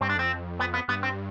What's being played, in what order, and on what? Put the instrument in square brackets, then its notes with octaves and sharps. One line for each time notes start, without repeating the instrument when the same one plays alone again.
[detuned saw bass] G2 [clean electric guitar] C4
[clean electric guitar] D4
[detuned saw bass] F2 [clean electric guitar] C4
[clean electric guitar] B3
B3
[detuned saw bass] G2 [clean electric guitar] B3
[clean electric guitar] C4